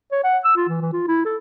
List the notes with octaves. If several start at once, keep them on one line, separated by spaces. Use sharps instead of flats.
C#5
F#5
E6
F4
E3
E3
F4
E4
A4